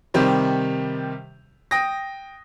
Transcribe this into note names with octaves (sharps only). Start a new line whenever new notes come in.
C3 D#3 G3 G4 C5
G5 D#6 A#6